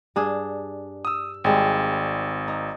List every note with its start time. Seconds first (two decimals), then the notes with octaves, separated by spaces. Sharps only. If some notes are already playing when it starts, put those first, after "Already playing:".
0.16 G2 D4 G#4
1.05 D#6 E6
1.44 G#1 G3 G#3 C4
2.48 D#4